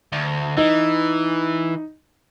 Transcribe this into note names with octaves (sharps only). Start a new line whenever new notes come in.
D2
E3 D#4